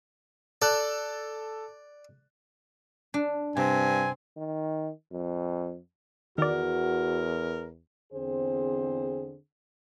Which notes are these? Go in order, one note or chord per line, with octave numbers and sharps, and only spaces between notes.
A4 D5 A5 F#6
D4
G2 C3 C4 G#5
D#3
F2
E2 D#3 F#4 A#4 D5
E2 D3 C4 G#4 C5